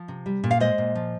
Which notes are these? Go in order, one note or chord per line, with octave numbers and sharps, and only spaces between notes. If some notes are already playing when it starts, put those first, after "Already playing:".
Already playing: F3
C3
G3
A#2
F5
G#3 C5 D#5
A#2
F3